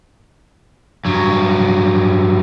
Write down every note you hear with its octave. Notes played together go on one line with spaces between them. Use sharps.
G2 F#3